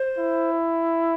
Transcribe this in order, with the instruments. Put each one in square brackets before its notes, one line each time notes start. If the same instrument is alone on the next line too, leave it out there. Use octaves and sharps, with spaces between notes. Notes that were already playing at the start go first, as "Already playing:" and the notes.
Already playing: [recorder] C5
[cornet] E4